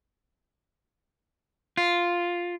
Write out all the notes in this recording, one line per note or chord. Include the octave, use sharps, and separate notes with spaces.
F4